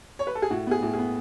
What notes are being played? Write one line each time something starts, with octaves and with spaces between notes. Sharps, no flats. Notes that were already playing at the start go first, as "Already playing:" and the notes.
C#5
B4
A4
G#4
A2 F#4
B3 G#4
A2
G#4
B3